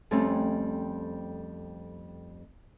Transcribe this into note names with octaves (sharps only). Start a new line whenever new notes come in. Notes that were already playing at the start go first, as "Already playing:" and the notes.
F2 G3 A3 C4 C#4